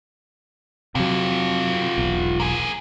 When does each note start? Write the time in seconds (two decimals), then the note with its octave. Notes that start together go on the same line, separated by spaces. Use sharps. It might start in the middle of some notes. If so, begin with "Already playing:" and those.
0.95 C3 F#3 F4 G4
1.98 E1 B1
2.40 A#3 G#4